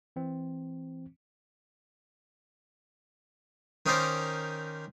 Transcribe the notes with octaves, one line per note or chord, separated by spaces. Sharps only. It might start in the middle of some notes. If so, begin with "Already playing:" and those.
E3 C4
D#3 C#4 D#4 A#4 C5 D5